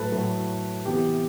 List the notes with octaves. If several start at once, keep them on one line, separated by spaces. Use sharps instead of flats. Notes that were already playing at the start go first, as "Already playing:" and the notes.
Already playing: A2 F#3 A3 A4 B4
A2 F#3 A3
C3 E3 B3 G4